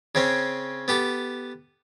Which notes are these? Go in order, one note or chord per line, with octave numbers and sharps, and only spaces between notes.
C#3 C4 C#4
B3 G4 A4